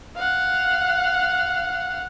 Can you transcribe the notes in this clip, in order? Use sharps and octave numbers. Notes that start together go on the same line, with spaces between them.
F5 F#5